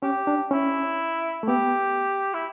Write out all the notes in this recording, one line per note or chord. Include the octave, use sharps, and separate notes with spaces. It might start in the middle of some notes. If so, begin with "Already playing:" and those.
C#4 G4
D4
C#4 E4
A3
B3 G4
E4